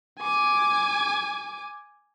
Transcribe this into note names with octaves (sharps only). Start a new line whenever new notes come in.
G#5 D6